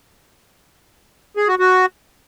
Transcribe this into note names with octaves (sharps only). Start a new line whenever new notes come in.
G#4
F#4
F#4